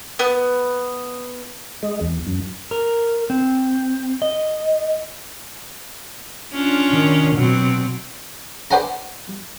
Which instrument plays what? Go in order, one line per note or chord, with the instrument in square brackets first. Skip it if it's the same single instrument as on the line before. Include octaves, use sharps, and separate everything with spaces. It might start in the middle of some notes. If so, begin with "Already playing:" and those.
[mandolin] B3
[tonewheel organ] G#3
E2
F#2
[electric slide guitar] A#4
C4
D#5
[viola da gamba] C#4 D4 F4
[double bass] D#3
[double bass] B2 [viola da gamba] F#3 C4
[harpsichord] B4 C5 D5 F#5 G#5 A#5